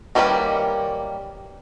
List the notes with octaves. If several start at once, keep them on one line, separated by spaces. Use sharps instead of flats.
D#3 G3 A#3 C#4 B4